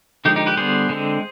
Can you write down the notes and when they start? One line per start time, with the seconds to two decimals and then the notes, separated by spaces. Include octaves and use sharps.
0.25 D3 F3 G#3 D#4 G4
0.36 D#4 G4
0.46 G4 B4
0.57 D3 G3 B3 G#4 C5
0.89 D3 G#3 C4